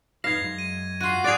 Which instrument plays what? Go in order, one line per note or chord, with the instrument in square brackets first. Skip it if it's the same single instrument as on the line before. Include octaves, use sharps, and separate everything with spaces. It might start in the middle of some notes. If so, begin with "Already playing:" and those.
[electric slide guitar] F2 D#4 B4 [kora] F5 [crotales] G#6 A#6
[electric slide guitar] F#2 G#3
[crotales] D#7
[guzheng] F4 F#4 [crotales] C7 D#7
[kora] G#4 D5 [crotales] F#6 A6 F7